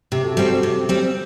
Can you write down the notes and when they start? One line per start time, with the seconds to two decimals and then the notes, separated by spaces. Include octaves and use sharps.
0.12 C3 G4
0.24 F#4 A4
0.37 G3 C4 F#4 A4
0.50 G4
0.63 C3 G4
0.89 G3 C4